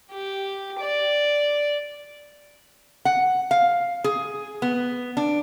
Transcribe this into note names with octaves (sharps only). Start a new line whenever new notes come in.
G4
D5
F#5
F5
G#4
B3
D4